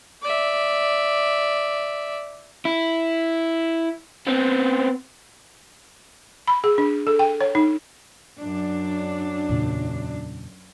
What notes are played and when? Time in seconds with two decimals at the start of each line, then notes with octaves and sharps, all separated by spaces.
0.22 D5 E5
2.65 E4
4.27 B3 C4
6.48 B5
6.64 G#4
6.78 D4
7.07 A4
7.19 G5
7.41 C#5
7.55 D#4
8.39 F#2 D4
9.49 E2 A#2 C#3